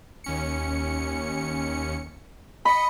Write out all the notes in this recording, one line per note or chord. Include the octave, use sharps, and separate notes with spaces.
D#2 C#4 C#7
D#5 B5 C#7